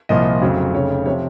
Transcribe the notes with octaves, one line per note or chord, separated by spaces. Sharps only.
C2 A#2 F3 D#5
F1 F2 C#3 F#3
F1 F2 C#3 C#5
C3 F3 C#5